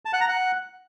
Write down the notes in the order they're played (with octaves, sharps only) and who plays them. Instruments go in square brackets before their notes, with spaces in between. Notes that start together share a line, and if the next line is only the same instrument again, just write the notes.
[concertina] A5
F#5
A#5
F#5